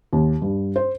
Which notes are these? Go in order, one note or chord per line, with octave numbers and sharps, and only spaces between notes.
D#2
G2
C5